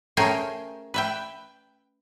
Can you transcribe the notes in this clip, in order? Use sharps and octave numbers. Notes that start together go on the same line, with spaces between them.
A3 C#4 G#4 A#4 C5 G5
B4 E5 G5